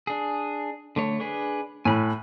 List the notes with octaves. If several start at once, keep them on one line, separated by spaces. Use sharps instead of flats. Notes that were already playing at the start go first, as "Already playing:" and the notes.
D4 G#4
D3 A3 C#5
D4 G#4 B4
A2 G#5 B5 F#6